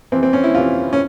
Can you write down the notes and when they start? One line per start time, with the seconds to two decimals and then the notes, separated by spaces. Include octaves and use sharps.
0.12 F2 C3 E3 C4
0.23 C4
0.33 C#4
0.44 E4
0.55 F2 C3 E3 F4
0.93 C#4